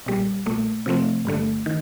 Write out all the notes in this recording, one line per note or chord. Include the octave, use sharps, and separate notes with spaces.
A#1 A#2 G3
A#1 A#2 A3
C3 F3 A3 C4
G1 G2 D3 A3
D#3